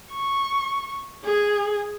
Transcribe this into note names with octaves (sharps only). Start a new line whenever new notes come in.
C#6
G#4